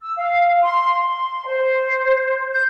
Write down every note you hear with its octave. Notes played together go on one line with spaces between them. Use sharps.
E6
F5
C6
C6
C5
G6